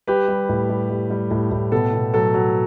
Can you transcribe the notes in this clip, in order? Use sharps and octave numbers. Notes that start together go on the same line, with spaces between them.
G3 G4 B4
G3
A2
G3
G3
G3
A2
A2
B2 A4
B2
F#3 A4
F#3